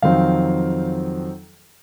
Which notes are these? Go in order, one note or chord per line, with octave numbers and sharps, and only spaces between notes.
F2 D#3 F#3 C4 F5